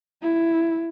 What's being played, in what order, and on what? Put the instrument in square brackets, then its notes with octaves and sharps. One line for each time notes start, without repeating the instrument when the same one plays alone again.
[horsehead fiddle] E4